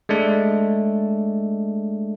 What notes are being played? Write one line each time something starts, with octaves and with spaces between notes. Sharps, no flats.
G#3 A3 D4